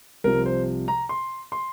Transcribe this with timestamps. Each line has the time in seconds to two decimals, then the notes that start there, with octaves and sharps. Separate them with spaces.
0.24 C2 C3 F3 A#4
0.46 C5
0.88 A#5
1.09 C6
1.52 C6